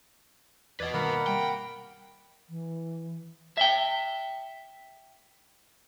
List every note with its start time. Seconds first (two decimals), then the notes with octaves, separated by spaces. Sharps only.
0.80 E2 B4 D5 D#5 G#6 A6
0.94 G2 B2 D#3 A#3 F#5 B5
1.27 C3 G3 G5
2.49 E3
3.57 E5 G5